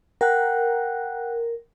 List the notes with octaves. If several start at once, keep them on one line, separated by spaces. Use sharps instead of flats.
A#4 F#5 G5 F#6